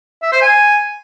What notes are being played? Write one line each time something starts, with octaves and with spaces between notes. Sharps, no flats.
E5
C5
G#5